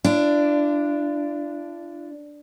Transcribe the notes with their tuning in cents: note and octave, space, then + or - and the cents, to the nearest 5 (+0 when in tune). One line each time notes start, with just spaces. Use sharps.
D4 +0 F4 -45